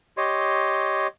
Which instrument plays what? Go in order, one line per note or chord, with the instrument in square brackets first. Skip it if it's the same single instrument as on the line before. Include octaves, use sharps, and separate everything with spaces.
[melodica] G4 C#5 D#5 C6